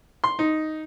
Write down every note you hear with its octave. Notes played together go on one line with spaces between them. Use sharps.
C6
D#4